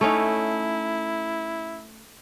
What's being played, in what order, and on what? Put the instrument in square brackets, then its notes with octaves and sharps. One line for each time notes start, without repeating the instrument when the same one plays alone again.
[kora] A3 C#4 D#4 [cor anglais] E4